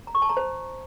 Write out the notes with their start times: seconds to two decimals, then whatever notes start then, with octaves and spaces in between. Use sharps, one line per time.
0.07 A#5
0.15 C#6
0.22 A5
0.29 A#5
0.37 C5